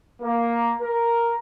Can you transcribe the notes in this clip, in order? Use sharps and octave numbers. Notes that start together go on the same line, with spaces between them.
A#3
A#4